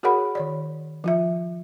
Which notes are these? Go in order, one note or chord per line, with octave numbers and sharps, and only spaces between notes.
F#4 G#4 A#4 C#5 F#5 B5
D#3 C#5 D5
F3 F4 E5